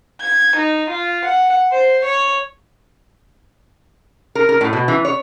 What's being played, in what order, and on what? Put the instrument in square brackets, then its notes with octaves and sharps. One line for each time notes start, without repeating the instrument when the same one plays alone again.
[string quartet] G#6
D#4
F4
F#5
C5
C#5
[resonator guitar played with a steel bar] A#4
A#4
A2
B2
E3
C#5